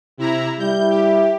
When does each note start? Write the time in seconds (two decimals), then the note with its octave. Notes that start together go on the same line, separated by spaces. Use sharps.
0.18 C3 E4 A#5
0.59 G3 E4 G6
0.89 G4